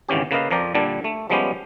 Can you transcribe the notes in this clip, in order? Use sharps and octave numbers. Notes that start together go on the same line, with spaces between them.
G#1 C#3 E3 C#4 G4
C#3 A#3 B4 D#5 F5
F2 F3 A#4 D5 G5
A#2 D3 G3 D4
A3
F3 G3 G#3 B3 C#4 G4